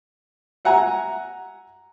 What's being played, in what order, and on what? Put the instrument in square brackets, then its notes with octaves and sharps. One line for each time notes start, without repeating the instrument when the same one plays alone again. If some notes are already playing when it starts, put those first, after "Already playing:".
[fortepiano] E5 F#5 G#5 A#5